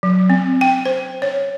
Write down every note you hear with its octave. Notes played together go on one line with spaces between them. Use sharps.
F#3
C4
G5
C5
C#5